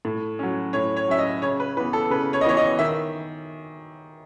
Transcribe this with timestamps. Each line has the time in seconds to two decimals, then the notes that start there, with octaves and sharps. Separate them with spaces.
0.05 A2
0.39 F#3 C#4
0.73 A2 C#5
0.97 C#5
1.08 F#3 C#4 E5
1.19 D#5
1.42 C#3 C#5
1.60 B4
1.77 E3 B3 B4
1.93 A4
2.10 C#3 B4
2.33 C#5
2.41 D#5
2.45 E3 B3 C#5
2.57 D#5
2.79 D#3 E5